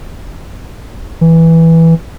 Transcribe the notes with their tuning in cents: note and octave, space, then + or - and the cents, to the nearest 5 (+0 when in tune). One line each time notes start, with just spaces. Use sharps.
E3 -5